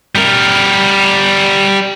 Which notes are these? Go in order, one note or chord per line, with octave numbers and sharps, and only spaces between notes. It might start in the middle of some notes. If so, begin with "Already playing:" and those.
G3 A#4